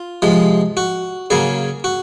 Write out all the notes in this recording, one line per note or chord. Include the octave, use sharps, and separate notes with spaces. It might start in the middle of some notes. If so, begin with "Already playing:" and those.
Already playing: F4
C3 F3 G#3
F#4
C#3 F#3 A#3 G#4
F#4